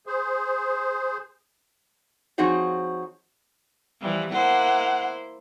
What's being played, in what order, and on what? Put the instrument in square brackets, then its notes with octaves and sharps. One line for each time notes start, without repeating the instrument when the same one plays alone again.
[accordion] G#4 C5
[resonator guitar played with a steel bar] F3 C4 D#4 F#4 G#4 C#5
[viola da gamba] E3 F3 G3
[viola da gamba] A#3 E4 C5 [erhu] F#5